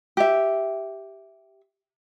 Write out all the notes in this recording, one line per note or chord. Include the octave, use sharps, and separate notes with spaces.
G4 E5